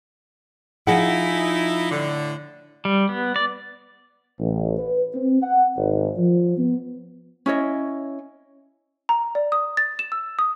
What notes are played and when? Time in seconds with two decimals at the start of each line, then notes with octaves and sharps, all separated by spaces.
0.87 F3 D#4 E4 G#4 F#5
1.91 A2 D3
2.85 G3
3.09 B3
3.36 D5
4.40 A1
4.79 B4
5.14 C4
5.43 F#5
5.77 G#1
6.18 F3
6.58 B3
7.46 C#4 E4 C#5 D#5
9.09 A#5
9.35 D5
9.52 D#6
9.77 A6
9.99 E7
10.12 E6
10.39 D#6